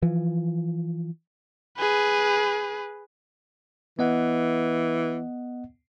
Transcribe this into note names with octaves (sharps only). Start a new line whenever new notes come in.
E3 F3
G#4 B4
E3 B3 D#5 F#5